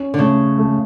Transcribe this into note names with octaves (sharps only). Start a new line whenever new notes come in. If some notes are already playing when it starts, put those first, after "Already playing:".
Already playing: C#4
D3
C#3 A3
A3